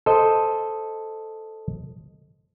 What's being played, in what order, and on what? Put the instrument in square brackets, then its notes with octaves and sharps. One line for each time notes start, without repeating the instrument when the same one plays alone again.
[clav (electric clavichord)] A4 C5 D#5